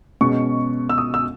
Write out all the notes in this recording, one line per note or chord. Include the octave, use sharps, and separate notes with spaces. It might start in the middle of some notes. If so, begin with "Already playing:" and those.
B2 G#3 C#4 C#6
E6
D#6
E6